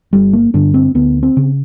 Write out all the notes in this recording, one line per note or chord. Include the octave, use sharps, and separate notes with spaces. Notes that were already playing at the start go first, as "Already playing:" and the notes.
G1 G3
A#3
G2 D3 D4
C4
D2 B3
C4
C#3